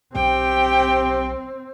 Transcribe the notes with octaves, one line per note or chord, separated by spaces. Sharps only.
B1 C4 G4 G5